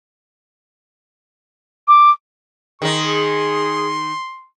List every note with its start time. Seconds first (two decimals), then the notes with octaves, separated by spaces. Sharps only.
1.88 D6
2.82 D#3 D#4 G#4 C6